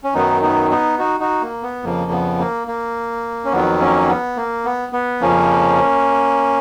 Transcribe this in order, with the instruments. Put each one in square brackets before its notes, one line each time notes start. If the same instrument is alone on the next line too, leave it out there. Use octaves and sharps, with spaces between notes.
[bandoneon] C#4
F#2 D#3 F#3 B3 D#4
B3 D#4
B3 D#4
D#4 F#4
D#4 F#4
A#3
B3
F2 C#3 F3 A#3
B3
A#3
A#3
C#4
F2 D#3 F#3 B3
A#3 C#4
B3
A#3
B3
B3
F2 C#3 F3 A#3 C#4